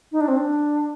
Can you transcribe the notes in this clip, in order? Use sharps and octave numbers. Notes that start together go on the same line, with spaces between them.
D#4
D4
C4
D4